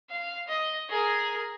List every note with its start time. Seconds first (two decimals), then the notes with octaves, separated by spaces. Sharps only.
0.10 F5
0.48 D#5
0.89 G#4 A#4